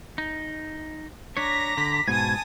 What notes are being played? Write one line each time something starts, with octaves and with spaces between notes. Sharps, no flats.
D#4
D4 C#5 A#5 D6 A#6 B6
D3 B6
G#2 B2 G#5 A5 D#6 G#6